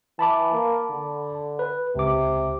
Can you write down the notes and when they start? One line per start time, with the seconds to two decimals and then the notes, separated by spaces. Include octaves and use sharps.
0.19 E3 A5 B5 D6
0.53 A#3
0.90 D3
1.59 B4
1.96 C#2 C3 D6